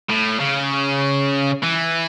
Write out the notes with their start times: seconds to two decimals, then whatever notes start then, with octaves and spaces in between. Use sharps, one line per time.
0.09 A2
0.39 C#3
1.63 E3